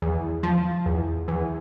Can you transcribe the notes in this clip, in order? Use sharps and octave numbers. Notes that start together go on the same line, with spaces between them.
E2
F3
E2
E2